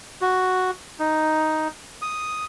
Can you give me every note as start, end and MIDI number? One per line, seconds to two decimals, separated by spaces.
0.21 0.71 66
1.00 1.68 63
2.02 2.45 87